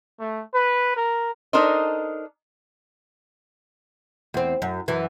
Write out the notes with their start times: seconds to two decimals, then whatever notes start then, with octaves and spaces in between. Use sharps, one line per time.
0.19 A3
0.54 B4
0.97 A#4
1.53 D4 D#4 A4 A#4 C5 D#5
4.34 E2 C4
4.62 F#2
4.88 F#2 E3